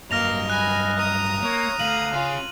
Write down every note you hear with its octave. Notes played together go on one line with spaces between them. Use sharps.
G2 F#3 A#3 D#5 F6 A#6 F7
G#5 B5 F#6
A#5 D#6
A#3 C#5
D2 D3 F5 D#7 F#7
C#4 F4 G#4